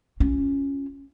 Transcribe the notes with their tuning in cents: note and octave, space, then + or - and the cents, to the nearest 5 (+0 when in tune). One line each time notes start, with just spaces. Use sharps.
C#4 +0 F4 +0